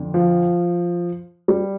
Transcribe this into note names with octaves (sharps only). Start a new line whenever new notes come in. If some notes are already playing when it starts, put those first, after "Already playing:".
Already playing: F2 D3
F3
G3